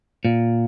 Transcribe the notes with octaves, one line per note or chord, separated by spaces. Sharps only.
A#2